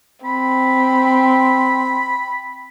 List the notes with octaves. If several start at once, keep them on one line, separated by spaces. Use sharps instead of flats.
C4 B5